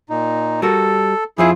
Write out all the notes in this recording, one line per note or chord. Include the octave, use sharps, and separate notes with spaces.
A#2 D#4
G3 F#4 A4 A#4
F2 F3 E4 F4 G#4